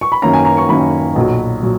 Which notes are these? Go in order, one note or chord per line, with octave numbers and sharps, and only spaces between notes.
C#6
B5
F#2 D#3 A#3 C#4 A#5
G#5
A#5
C#6
F#2 D#3 A#3 C#4 B5
B1 A#2 F#3
A#2 F#3